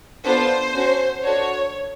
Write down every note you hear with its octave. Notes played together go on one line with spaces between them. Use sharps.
B3 D4 F4 A4 C5
C#4 F#4 A4
D4 F#4 A4 C#5